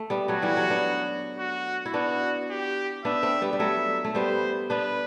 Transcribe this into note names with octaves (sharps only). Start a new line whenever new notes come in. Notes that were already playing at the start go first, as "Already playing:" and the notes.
Already playing: A3
G3 B3
F#3 A3 F#4
E3 G3
F#3
B3 D4
F#4
E4
B3 D4 F#4
G4
B3 D4 E5
A3 C4
G3 B3
G3
F#3 A3 E5
A3
G3 B3 C5
B3 D4 B4